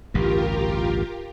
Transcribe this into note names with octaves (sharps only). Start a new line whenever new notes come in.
A1 D2 G2 F4 G4 A#4